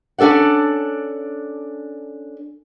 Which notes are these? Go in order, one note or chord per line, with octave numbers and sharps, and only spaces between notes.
C#4 D4 A4 D5 F#5